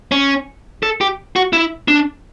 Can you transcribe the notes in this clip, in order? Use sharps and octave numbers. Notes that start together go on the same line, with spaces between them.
C#4
A4
G4
F#4
E4
D4